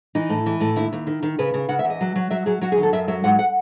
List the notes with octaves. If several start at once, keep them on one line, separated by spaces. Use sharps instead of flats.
E3 D#4
A2
E3
A2
D#2 E4
D#2
D#3
D#3
C#3 B4
C#3
C#3 F#5
E5
E2
D#5
F#3
F#3
F#3 E5
F#3 G#4
F#3 F#4
G#4
D#3
A4
F#2 E5
F#3 E5
G#2 F#5
F#5